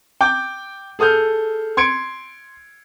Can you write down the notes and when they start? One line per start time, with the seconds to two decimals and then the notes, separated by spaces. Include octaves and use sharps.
0.21 G5 D6 G6
0.99 G#4 A4 D#6 F6 G6
1.77 C6 G#6 C#7 D7